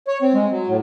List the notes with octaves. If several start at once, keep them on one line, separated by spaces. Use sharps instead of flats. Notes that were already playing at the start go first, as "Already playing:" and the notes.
C#5
C4
G#3
F#3
A2